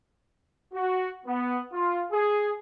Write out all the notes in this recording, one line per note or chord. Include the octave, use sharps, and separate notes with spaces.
F#4
B3
F4
G#4